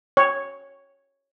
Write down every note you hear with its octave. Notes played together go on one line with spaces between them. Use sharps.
C#5